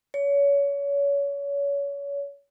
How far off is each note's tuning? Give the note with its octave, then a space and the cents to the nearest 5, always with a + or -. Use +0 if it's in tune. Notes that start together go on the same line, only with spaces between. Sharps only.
C#5 +30